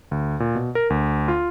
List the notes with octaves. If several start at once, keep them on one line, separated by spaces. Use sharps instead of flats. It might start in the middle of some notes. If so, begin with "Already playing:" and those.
D2
A#2
B2
A#4
D2
F4